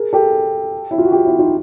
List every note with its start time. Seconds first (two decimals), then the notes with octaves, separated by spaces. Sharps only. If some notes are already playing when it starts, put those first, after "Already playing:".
Already playing: G#4 A#4
0.13 G4 A4
0.91 E4
0.98 F4
1.05 F#4
1.12 F4 G4
1.25 E4 F#4
1.39 D#4 F4